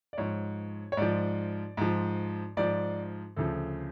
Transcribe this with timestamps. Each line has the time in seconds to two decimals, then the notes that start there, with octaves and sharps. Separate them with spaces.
0.13 D5
0.18 G#2 F3 C#5
0.92 C#5
0.97 G#2 F3 D5
1.77 G#2 F3
2.57 G#2 F3 D5
3.36 D2 C#3 F3 A4